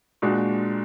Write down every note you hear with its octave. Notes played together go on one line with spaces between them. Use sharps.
A#2 G#3 D4 F#4